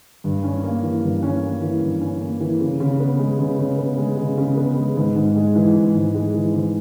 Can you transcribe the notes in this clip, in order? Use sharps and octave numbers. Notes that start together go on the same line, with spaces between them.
G2
C#4
A#3
E3
G2
C#4
A#3
E3
G2
C#4
A#3
E3
C#3
C#3
B3
G#3
C#3
C#3
B3
G#3
C#3
C#3
B3
G#3
G#2
G#2
G#3
E3
G#2
G#2
G#3
E3
G#2